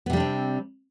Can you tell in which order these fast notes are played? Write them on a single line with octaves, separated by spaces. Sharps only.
B3 C3 G3 D4 C4